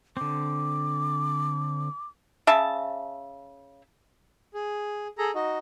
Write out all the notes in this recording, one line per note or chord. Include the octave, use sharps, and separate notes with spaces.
D3 C4 D6
C#3 E5 A5
G#4
G#4 A4 A#5
D#4 F#4 D#5